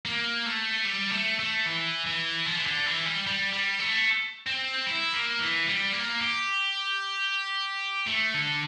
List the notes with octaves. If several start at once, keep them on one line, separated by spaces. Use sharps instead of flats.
A#3
A3
G3
A3
A3
E3
E3
F3
E3
D3
E3
G3
G3
G3
A3
C4
E4
A#3
E3
G3
A#3
G4
A3
D3